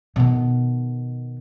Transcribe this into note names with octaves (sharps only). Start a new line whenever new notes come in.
B2 D#3